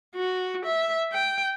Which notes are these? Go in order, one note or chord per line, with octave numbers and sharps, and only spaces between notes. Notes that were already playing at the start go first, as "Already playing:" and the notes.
F#4
E5
G5